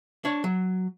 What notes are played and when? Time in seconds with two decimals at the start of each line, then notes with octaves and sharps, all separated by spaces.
0.25 D4 C#5
0.44 F#3